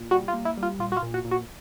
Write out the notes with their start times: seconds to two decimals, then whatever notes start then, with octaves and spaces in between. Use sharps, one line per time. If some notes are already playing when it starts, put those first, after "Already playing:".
Already playing: A#2
0.11 G3 F#4
0.28 F4
0.33 A#3
0.45 E4
0.57 G3
0.63 F4
0.79 A#2 F4
0.92 F#4
0.97 F4
1.03 A#2
1.14 F#4
1.25 A#2
1.31 F#4